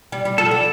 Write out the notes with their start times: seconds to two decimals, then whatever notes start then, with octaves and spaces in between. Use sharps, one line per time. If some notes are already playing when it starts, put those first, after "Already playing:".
0.12 G3
0.25 G3
0.38 F3 A4
0.51 D3